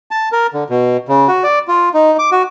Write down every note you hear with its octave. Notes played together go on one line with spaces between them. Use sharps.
A5
A#4
D3
B2
C#3
F#4
D5
F4
D#4
D6
F#4